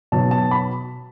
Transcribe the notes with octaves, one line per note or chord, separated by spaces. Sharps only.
B2 F#3 A5
A5
B5